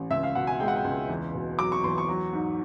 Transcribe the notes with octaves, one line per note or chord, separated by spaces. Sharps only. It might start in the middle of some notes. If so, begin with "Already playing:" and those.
Already playing: A1
C#2 E5
F5
B2 F#5
G#5
G#3 G5
F#5
G5
C#2
E2
B2
F#3 D6
C#6
E2 C6
C#6
F#3
G#2